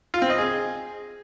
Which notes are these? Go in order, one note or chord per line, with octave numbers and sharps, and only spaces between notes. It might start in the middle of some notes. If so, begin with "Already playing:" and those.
F4
C4
D#5
G#4